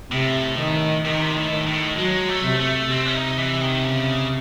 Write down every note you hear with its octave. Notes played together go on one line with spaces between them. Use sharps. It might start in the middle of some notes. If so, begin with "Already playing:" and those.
A2 C3
D#3
C3 D#3
A2
D#3
A2
F#3 G#3
A3
C3
A3
C3 C4
C#4
D#4
E3
D#3
C#3